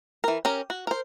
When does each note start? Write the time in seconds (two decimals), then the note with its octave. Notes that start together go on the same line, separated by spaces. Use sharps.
0.24 E3 A#4
0.45 C#4 G4 A#4
0.70 F#4
0.87 A#4 C5